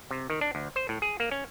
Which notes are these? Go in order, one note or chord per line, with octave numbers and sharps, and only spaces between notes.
C3
D#3
D4
D2
C5
A2
G#4
A#3
C#4